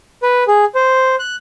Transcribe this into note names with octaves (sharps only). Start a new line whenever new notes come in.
B4
G#4
C5
F#6